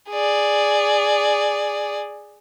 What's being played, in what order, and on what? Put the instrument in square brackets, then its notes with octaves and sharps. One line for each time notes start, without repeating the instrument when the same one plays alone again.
[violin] G#4 D5